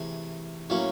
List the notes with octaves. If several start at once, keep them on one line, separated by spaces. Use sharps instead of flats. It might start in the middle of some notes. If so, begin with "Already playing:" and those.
Already playing: C3 E3 A3 G#4
A2 F#3 A#3 C#4